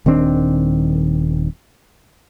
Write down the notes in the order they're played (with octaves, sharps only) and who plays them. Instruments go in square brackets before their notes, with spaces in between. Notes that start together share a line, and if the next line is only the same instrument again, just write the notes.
[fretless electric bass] D#1 D#3 C4 D4